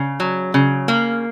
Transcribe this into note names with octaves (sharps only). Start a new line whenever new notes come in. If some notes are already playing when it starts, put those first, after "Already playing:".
Already playing: C#3
F#3
C#3
A#3